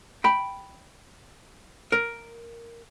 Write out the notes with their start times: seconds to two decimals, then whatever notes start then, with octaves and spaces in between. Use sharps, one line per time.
0.24 G5 B5
1.92 A#4